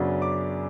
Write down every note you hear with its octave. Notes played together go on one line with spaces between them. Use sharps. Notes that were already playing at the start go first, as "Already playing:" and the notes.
Already playing: F#2 C#3 F#3 B3 D4
D6